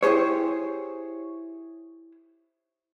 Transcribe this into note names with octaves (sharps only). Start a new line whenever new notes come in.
E4 G4 G#4 C5 C#5